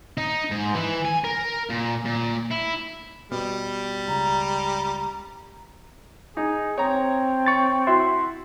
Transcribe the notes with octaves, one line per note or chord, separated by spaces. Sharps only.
D#4
G#2
E3
G#5
A#4
A#2
A#2
E4
B2 G3
C#2 A#5
D#4 G#4
C4 C#5 A#5
C#6 A6
E4 F#4 E5 C6